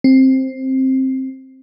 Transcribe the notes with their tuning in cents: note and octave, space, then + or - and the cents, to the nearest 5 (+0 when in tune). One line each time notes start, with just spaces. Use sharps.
C4 +10